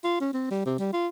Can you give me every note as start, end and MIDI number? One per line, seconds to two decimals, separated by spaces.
0.04 0.20 65
0.21 0.32 61
0.33 0.50 60
0.51 0.61 55
0.66 0.76 48
0.79 0.92 55
0.93 1.08 65